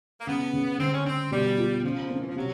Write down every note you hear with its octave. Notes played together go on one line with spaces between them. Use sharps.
A#3
C#3 B3
C#3
D3 C4
C#4
C4 D4
B2 G3
F4
C#3 F3
D3
D#3 C4
E3
F3
C3 F#3